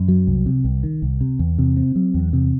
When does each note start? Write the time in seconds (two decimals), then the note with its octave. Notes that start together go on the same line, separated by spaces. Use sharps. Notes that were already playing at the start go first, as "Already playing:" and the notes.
Already playing: F#2
0.08 F#3
0.27 C2
0.46 C3
0.65 C2
0.83 D#3
1.02 C2
1.21 C3
1.39 E2
1.59 C3
1.77 C4
1.96 F#3
2.14 E2
2.33 C3